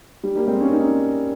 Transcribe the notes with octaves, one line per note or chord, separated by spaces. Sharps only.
G3
G3 A#3
G#3 C4
A#3 C#4
C4 D#4